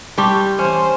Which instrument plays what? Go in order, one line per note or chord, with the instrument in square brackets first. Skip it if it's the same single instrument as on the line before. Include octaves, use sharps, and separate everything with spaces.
[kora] G3 G4 [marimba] A5 C6 C#6
[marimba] E3 [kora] C#4 [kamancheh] C5